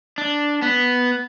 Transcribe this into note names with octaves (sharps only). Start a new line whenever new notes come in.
D4
B3